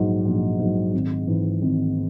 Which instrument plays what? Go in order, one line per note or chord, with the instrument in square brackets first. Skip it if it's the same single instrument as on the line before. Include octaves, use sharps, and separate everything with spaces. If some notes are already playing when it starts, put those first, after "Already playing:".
Already playing: [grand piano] A#1 G#2 F#3
A#1
G#2 F#3
G#1
G#2 E3
G#1